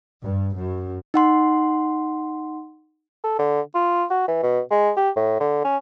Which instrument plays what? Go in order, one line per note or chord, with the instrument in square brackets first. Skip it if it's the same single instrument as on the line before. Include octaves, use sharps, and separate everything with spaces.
[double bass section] G2
F#2
[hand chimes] D#4 F#5 C6
[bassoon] A4
D3
F4
F#4
E3
B2
G#3
G4
A2
D3
C#4